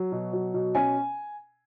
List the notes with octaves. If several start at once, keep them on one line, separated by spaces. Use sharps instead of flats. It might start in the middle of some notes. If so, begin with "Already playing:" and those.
Already playing: F#3
B2
F#3
B2
C#4 G#5